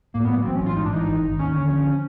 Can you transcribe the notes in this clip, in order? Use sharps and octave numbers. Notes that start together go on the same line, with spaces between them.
A2 A#3
B3
F#3
A#3
A1 C4
C#4
A1 F4
G#2 D#4
D4
E3 D#4
G#1
G#1
D#2 C#4
D3
F3